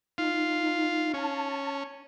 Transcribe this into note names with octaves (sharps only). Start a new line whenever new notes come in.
D#4 F4
C#4 A5